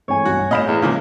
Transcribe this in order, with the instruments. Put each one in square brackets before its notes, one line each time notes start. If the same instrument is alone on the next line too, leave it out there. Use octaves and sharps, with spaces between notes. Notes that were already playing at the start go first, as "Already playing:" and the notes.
[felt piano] G#2 E3 A3 [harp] C#5 G#5
[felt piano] B1 G2 [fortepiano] F#4
[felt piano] A2 G6 E7 [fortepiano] D#5 F5 B5
[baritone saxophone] E2
[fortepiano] C#3 F3 G#3 [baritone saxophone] A#3 [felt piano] F#4 F6